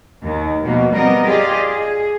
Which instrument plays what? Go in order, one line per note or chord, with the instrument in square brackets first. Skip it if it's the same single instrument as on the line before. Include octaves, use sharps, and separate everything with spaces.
[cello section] D#2 D#3
B2 F3 A#3
G3 B3 C4 A#4 D#5
F4 G4 G#4 D5 D#5
G#4